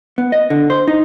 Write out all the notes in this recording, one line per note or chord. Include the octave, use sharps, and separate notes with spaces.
B3
D#5
D3
C5
D#4